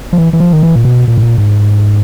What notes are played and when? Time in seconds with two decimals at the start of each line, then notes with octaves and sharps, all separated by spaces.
0.13 F3
0.18 E3
0.33 E3
0.40 F3
0.53 D#3
0.63 E3
0.76 A#2
0.85 B2
1.08 A#2
1.17 A2
1.23 A#2
1.38 G#2